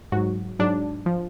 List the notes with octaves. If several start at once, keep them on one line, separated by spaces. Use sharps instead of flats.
G#2 F#3 F#4
G#2 F#3 D4
F3